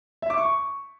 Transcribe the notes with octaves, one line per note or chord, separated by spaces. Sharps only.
E5
D6
C#6